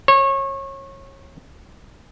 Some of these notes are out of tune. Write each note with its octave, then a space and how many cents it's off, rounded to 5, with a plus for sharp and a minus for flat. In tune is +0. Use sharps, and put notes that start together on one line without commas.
C#5 -25